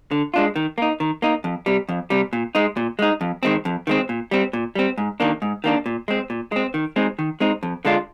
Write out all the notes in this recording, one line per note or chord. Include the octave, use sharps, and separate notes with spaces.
D3
G#3 D4 F4
D#3
A#3 D#4
D#3
A#3 D#4
F2
C3 G3
F2
C3 G3
A#2
G#3 D#4
A#2
G#3 D#4
F2
D#3 G#3 C4
F2
D#3 G#3 C4
A#2
G3 C4
A#2
G3 C4
G#2
D#3 A#3 D4
G#2
D#3 A#3 D4
A#2
G#3 C4
A#2
G#3 C4
D#3
G#3 C4 D#4
D#3
G#3 C4 D#4
F2
D3 G#3 D4 F4